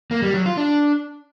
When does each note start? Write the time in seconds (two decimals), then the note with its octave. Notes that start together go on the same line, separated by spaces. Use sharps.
0.11 A#3
0.22 G3
0.34 F#3
0.46 F4
0.57 D4